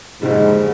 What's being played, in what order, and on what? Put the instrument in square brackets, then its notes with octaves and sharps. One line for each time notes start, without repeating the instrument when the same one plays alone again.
[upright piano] F#1 F2 D3 G3 [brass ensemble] G#2